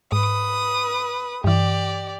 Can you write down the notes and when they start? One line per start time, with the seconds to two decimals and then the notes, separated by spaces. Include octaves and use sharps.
0.12 G#2 B4 D#6
1.44 G2 E3 G4 D5